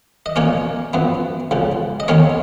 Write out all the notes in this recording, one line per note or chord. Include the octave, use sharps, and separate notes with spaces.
D#5
A#2 F3 A#3 C#4 C#5
F#2 F3 B3
C#2 C#3 F3
D#5
D#2 D#3 A#3 C#4 C#5